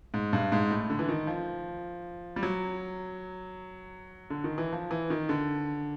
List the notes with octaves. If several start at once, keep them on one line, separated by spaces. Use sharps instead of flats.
G#2
G2
G#2
A2
D3
E3
D#3
F3
G3
F#3
D3
D#3
E3
F3
E3
D#3
D3